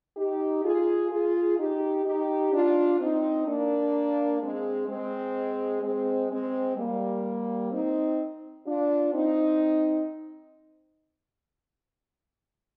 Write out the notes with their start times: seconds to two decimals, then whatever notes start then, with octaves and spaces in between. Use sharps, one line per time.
0.17 D#4 G4
0.64 F4 G#4
1.11 F4 G#4
1.58 D#4 G4
2.05 D#4 G4
2.52 D4 F4
3.00 C4 D#4
3.47 A#3 D4
4.41 G#3 C4
4.88 G#3 C4
5.82 G#3 C4
6.30 G#3 C4
6.77 G3 A#3
7.71 C4 D#4
8.66 D4 F4
9.13 C4 D#4